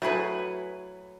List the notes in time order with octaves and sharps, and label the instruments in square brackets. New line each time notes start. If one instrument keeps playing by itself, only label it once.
[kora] F#3 [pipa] A3 E4 G#4 B4